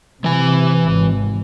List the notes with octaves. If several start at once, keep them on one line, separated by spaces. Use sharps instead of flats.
C3 E3 G#5
G#1